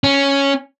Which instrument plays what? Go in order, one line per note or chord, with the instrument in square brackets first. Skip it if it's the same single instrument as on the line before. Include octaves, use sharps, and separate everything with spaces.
[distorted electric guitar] C#4